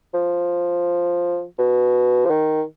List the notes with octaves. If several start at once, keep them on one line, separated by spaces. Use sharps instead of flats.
F3
B2
F3
D#3